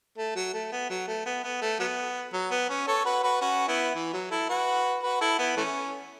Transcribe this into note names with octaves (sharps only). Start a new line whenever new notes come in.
A3
F#3
A3
B3
F#3
A3
B3
B3
A3
F#3 B3
F#3
B3
C#4
A4 C#5
F#4 B4
F#4 B4
C#4 F#4
B3 E4
E3
F#3
E4 A4
F#4 B4
F#4 B4
E4 A4
B3 E4
E3 A3 C#4